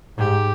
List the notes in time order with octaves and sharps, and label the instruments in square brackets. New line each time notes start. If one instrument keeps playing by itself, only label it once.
[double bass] G#2 [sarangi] G4